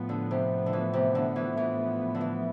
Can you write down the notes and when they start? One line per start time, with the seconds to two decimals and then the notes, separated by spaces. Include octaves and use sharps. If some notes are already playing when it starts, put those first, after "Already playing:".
Already playing: A2 F3 B3
0.09 D3
0.31 C3
0.66 D3
0.73 E3
0.93 C3
1.15 D3
1.36 E3
1.57 E3
2.15 D3
2.21 E3